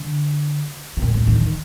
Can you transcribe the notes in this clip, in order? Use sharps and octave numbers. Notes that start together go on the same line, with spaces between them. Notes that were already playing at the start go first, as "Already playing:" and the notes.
Already playing: D3
C3
A#2
A2
D#3
D#3